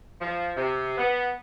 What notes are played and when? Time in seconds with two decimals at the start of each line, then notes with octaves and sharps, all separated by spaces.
0.20 F3
0.57 C3
0.98 B3